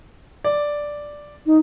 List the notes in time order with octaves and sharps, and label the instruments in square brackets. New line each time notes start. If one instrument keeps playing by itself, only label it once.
[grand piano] D5
[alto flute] D#4